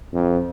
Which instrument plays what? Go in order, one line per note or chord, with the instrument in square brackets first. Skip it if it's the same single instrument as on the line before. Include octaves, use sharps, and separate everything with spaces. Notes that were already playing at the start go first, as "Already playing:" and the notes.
[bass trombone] F2